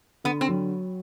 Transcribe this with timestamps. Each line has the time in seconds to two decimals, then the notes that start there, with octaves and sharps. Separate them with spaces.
0.24 D3 B3
0.41 C4
0.49 F#3